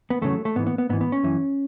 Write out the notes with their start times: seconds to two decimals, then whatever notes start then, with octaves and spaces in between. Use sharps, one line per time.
0.10 B3
0.21 E2 C#3 F#3 A3
0.45 A3
0.56 G#2 B3
0.59 E3
0.67 B3
0.78 B3
0.89 G#2 B3
0.93 E3
1.01 B3
1.12 C#4
1.23 F#2 E3